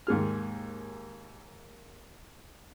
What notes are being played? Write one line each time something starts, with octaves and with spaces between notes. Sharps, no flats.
D#2 G#2 G#4 F6